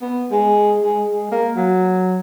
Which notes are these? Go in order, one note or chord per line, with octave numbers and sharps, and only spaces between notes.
B3
G#3
G#3
G#3
A#3
F#3